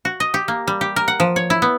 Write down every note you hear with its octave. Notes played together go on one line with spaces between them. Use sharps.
F#4
D#5
G4
A#3
G3
G4
A#4
F#5
F3
C#5
E4
B3